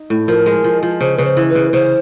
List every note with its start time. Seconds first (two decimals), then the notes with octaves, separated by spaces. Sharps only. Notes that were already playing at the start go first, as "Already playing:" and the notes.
Already playing: D#4
0.10 A2
0.28 F3 A#4
0.46 G#3
0.64 F3
0.83 F3
1.00 C#3 C5
1.17 C#3 B4
1.25 C5
1.37 E3
1.49 B4
1.55 C#3
1.73 C#3 C5